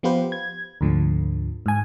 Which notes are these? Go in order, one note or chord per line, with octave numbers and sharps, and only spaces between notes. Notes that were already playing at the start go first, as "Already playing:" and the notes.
F3 B3 F4 G4 B4 C5
G#6
D2 G#2 D3 F3
G#2 G#5